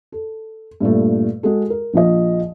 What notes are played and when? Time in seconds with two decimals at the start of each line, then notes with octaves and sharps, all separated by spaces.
0.12 A4
0.80 G2 A#2 A3
1.43 G#3 F#4 G#4 A4
1.70 A#4
1.94 A#1 F3 D#5